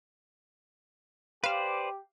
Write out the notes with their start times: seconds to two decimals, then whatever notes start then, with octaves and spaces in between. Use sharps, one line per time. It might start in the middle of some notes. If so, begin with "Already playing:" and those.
1.44 G4 B4 C5 D5 F5